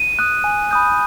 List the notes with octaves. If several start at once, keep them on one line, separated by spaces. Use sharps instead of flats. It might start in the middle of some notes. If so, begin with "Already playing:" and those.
Already playing: D#7
D#6 F#6
G#5
B5 D#6 G6